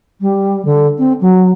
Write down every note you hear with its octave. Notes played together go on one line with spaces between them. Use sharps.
G3
D3
C4
F#3